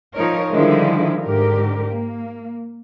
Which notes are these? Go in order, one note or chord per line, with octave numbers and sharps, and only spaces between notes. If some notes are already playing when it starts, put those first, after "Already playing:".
F3 D#4 A#4 C#5
D3 D#3 F3 G3 G#3 E4
G#2 D3 G4 A#4
A#3